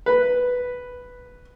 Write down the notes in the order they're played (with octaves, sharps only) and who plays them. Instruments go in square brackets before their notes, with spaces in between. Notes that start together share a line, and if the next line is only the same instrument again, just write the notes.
[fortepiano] B4